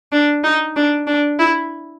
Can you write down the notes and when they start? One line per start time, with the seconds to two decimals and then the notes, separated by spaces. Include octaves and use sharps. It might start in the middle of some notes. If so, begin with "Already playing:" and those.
0.12 D4
0.44 D#4
0.76 D4
1.07 D4
1.39 E4